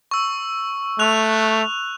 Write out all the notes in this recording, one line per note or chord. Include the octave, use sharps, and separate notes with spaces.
C#6 E6
A3 F#6 F7